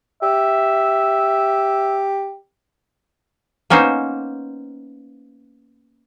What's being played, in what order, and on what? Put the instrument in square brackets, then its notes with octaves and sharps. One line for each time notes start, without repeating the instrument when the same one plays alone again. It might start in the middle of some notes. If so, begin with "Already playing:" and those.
[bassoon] G4 [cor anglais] E5
[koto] A#3 B3 C#4 D#4 C5